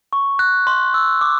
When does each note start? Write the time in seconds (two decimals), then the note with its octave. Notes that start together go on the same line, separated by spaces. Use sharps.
0.13 C#6
0.39 F#6
0.67 C6
0.94 E6
1.21 D6